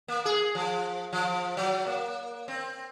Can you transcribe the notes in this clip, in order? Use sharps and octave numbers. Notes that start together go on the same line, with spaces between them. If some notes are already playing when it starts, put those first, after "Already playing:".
A#3
G#4
F3
F3
F#3
A#3
C4